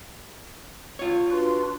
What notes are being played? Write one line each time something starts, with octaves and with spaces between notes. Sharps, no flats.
F4 C#5
D4 F#4 B4 C6